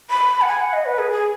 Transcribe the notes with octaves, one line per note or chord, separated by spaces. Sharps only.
B5
F#5
G#5
F#5
D#5
B4
G#4
G#4